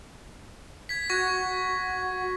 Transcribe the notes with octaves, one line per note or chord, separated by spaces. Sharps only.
G#6 B6
F#4 C#6 G#6 A#6